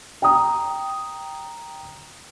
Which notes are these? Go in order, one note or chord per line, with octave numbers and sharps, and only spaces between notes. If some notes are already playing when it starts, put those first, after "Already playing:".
G5 A#5 D#6